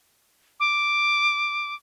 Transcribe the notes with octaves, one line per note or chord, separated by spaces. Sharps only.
D6